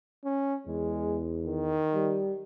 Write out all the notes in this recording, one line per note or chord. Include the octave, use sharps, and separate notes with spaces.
C#4
E2 G#3
D#3
G3